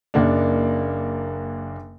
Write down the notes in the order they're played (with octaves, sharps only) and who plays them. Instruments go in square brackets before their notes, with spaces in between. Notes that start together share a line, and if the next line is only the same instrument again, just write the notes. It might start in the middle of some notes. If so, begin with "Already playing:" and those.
[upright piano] F#1 A#3 D4